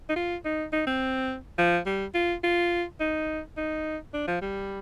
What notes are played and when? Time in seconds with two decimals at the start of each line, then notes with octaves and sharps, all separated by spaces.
0.09 D#4
0.16 F4
0.45 D#4
0.73 D#4
0.87 C4
1.58 F3
1.86 G3
2.14 F4
2.44 F4
3.00 D#4
3.57 D#4
4.13 D4
4.27 F3
4.41 G3